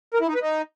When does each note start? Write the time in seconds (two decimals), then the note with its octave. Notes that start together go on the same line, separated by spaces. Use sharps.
0.14 A#4
0.21 E4
0.28 D#4
0.35 B4
0.42 D#4